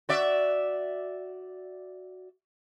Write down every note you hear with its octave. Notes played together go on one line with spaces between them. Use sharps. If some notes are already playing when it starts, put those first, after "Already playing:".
F#4 D5 E5